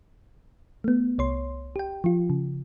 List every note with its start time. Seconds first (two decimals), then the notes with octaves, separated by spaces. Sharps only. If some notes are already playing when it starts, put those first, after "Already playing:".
0.84 A3 B3
1.18 C2 C#5 C6
1.76 G4 G5
2.04 F3 F4
2.30 C#3